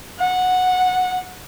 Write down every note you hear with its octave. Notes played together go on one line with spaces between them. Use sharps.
F#5